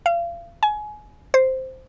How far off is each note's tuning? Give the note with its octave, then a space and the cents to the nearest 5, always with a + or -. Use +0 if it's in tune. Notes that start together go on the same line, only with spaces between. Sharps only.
F5 -35
G#5 +25
C5 -5